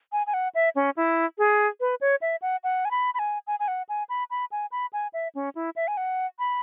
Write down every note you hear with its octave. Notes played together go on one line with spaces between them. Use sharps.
G#5
G#5
F#5
E5
C#4
E4
G#4
B4
C#5
E5
F#5
F#5
G#5
B5
B5
G#5
G#5
G#5
F#5
G#5
B5
B5
G#5
B5
G#5
E5
C#4
E4
E5
G#5
F#5
B5